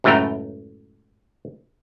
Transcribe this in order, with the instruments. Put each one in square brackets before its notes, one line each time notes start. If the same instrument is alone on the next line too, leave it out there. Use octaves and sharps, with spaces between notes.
[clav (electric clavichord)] C#2 F#2 A2 A3 G5 A#5